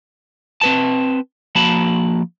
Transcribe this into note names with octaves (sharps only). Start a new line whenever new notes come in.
C4 B4 A5
F3 A#3 F#4 A5 B5